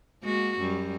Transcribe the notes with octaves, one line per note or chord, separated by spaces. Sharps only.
G#3 A#3 F#4
F#2 G3